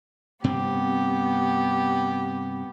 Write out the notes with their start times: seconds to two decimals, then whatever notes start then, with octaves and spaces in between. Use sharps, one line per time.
0.44 G2 C3 B3 C4 G4